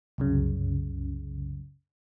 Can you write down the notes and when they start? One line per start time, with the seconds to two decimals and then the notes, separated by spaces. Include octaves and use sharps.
0.18 C2 F#2 C#3